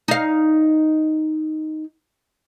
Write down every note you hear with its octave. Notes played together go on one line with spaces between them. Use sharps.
D#4 F5